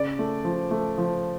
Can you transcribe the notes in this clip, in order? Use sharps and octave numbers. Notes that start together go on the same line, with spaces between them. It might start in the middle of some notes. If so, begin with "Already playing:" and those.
Already playing: C#3 D5
A3
F3
A3
F3